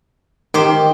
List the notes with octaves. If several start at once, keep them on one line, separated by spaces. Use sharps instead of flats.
D#3 G4 C5 G5